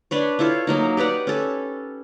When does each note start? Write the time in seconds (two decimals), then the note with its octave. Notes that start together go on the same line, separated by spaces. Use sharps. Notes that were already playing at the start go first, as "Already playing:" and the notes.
0.11 D4 B4 C#5
0.39 E4 F4 A4 C#5
0.67 F#3 A#3 D#4
0.97 G4 B4 D5 F#5
1.27 C#4 A4